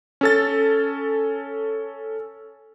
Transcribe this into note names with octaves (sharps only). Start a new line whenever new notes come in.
C#4 A4 A6